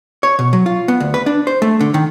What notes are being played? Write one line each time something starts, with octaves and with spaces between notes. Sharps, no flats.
C#5
B2
F#3
F4
B3
D2
B4
D4
C5
A3
D3
D#3